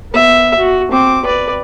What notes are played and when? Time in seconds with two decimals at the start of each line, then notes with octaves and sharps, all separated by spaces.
0.13 B3 E5
0.58 F#4
0.91 C4 D6
1.25 B4 D5